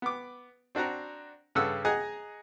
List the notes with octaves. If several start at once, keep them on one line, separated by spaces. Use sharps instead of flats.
B3 D6
C4 D4 F#4 F#5 A#5
G2 C#3 A4 F#5 E6
G#4 D#5 F#5 G#5 A#5